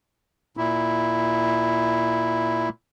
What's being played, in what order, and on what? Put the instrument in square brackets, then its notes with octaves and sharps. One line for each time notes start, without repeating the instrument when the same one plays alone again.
[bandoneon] A#2 E4